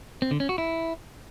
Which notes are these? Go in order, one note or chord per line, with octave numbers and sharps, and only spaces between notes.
C4
D3
C#4
F#4
E4